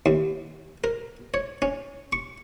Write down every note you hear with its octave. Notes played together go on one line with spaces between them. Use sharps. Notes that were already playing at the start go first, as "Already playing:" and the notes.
D#2
A#4
C#5
C#4
C#6